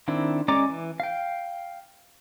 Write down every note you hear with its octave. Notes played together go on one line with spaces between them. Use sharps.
D#3 C4 D4 E4
G#3 C#4 D5 A#5 D6
E3
F5 G5